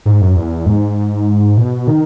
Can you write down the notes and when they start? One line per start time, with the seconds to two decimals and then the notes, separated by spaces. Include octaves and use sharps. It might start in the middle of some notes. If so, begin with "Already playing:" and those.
0.05 G#2
0.21 F#2
0.36 E2
0.66 G#2
1.57 B2
1.87 D#3